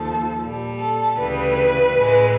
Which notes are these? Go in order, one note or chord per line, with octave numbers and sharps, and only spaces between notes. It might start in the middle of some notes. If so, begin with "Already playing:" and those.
Already playing: D#2 F3 A4
A#2 G3
A4
D2 C#3 E3 G3 B4
A2 E3 G#3